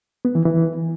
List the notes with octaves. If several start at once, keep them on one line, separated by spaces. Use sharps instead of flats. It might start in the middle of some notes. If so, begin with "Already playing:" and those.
B3
E3
E3